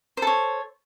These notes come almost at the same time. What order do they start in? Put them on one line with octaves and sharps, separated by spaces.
C5 A4 C#5